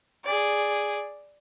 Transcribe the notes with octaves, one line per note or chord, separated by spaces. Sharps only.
G#4 D5